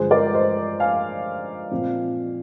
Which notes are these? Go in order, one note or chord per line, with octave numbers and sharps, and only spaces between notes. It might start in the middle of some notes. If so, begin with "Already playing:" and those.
Already playing: G2 D3 F3 G#3 G#4 C5
A#4 D5
C5 D#5
F5 G#5
A#2 F3 C4